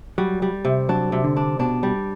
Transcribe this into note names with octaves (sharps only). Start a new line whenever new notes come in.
F#3 G3
G3
C3
F#3 D4
C3
D3
D4
B2 D4
G3